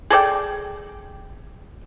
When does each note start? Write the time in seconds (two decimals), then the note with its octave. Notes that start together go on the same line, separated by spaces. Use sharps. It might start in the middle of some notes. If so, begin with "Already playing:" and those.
0.10 G#4 A4 D5 G5